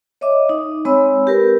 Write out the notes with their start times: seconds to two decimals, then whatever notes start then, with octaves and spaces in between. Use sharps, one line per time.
0.21 C#5 D#5 E5 D6
0.49 D#4
0.85 G#3 C4 C#5 B5 E6
1.27 G4 A#4 B4